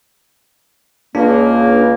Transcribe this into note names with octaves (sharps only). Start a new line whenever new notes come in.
C#2 A#3 D4